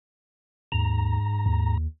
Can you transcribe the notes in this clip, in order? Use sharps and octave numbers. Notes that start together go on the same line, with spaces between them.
D#2 G#2 A#5
D#2